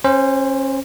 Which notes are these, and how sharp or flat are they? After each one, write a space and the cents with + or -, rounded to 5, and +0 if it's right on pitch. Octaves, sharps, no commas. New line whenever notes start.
C#4 -30 C5 +0